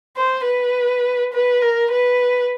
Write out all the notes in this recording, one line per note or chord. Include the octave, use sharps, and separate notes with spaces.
C5
B4
B4
A#4
B4